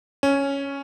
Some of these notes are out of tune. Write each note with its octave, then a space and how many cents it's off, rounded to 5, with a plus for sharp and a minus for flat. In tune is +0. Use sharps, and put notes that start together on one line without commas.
C#4 +0